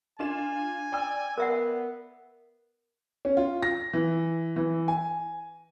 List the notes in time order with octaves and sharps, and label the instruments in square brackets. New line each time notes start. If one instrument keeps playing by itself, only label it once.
[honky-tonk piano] D4 F4 E7 [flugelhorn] G#5
[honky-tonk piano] D5 G5 E6
[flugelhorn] B3 [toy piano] A#4 E5 F#5
[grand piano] C#4
F4
A#6
E3
E3
G#5